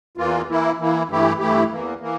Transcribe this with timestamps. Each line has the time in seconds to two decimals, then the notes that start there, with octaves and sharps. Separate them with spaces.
0.17 E2 E3 A#3 F4
0.48 E3 A#3 E4
0.78 E3 A#3 E4
1.09 G2 E3 A3 E4 G4
1.39 G2 E3 A3 E4 G4
1.69 E2 E3 A#3
2.00 E3 A#3